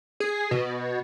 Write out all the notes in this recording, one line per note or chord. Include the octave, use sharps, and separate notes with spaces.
G#4
B2